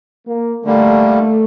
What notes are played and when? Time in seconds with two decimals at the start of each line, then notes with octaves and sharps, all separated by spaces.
0.27 A#3
0.65 D3 G3 A3 A#3